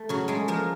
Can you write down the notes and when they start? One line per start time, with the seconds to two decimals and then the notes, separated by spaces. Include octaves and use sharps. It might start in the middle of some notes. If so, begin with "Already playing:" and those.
Already playing: A3
0.09 C#3 F#3 F#4
0.28 G#3 A3 G#4
0.48 F3 A#3 A#4